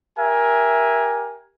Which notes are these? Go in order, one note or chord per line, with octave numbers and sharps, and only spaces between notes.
G4 A#4 E5 G#5